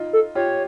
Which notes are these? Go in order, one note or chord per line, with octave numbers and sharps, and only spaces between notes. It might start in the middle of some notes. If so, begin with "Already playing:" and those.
Already playing: D#4 F4
A4
F4 G4 C#5